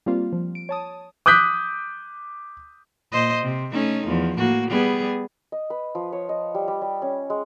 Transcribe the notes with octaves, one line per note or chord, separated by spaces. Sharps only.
G3 A#3 C4 F4
F3
D7
C#5 A5 D#6
D6 D#6 F#6 G6 B6
A#2 C5 D#5
C3
A3 C#4 D#4
E2 F3
A2 A#3 F#4
G3 B3 G#4
D#5
B4
F3
C#5
D#5
G3
G3
G3
C#4
G#3